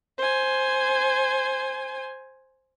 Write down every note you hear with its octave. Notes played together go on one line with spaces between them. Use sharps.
C5 G#5